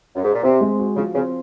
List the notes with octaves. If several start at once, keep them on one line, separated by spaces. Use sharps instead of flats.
F#2
G#2
A#2
C3 C4
G#3
F#4
C#3 F3
C#3 C4